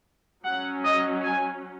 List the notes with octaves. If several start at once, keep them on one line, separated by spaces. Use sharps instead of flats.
F#3 C#4 F#5
D#5
G#5